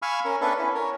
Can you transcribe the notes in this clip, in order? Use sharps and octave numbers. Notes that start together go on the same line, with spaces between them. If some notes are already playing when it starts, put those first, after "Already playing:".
F5 G#5 B5 C#6 E6 F6
C#4 A#4
B3 C#4 D4 A4 B4 E5
C#4 E4
A#4 C#5